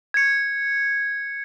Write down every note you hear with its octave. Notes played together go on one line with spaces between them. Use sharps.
G#6 C#7